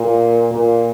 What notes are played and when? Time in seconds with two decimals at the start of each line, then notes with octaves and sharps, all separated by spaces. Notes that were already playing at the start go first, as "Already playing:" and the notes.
Already playing: A#2
0.51 A#2